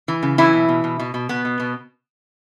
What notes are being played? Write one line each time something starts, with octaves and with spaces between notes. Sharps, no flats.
E3
C#3
E3 F#3 E4
B2
B2
B2
B2
B2
B2 B3
B2
B2